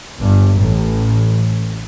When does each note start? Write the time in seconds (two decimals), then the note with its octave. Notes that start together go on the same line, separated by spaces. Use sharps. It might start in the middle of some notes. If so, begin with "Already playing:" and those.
0.22 G1 G2
0.59 A1 A2